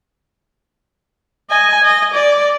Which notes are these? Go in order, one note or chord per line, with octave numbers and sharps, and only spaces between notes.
D#5 G#5
D#5
D5